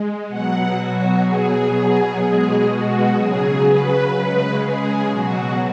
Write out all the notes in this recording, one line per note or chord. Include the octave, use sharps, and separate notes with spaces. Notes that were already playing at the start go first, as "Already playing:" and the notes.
Already playing: G#3
B2 F#3 F#5
F#4
B2 F#3 G#4
G#4
B2 G#3 G#4
F#4
C#3 F#3 G#4
B4
C#3 G#3
G#4
B2 F#3 F#4